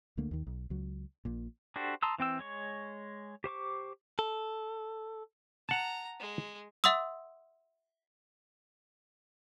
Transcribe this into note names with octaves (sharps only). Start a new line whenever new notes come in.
D2 D3 A3 A#3
D#2 D#3
B1
C#2 F#3
A#1 A#2
D4 F#4 G4 A4 C5
A5 A#5 C6 D#6 E6
E3 C4 G5 E6
G#3 C#5 C#6
G4 C5 C#6 D6
A4
F#5 A5 A#5
G#3
E5 F#5 C6 D#6 E6